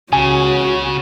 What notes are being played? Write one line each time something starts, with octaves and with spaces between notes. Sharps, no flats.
C#2 C#3 C#4 F#4 G#5